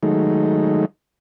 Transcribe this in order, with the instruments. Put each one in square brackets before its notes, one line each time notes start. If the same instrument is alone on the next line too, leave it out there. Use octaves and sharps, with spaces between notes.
[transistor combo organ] D#3 F#3 G#3 A3 D#4